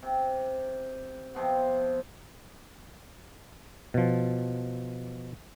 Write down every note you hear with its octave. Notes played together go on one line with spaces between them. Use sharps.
C3
C3 F3 B3
B2 F3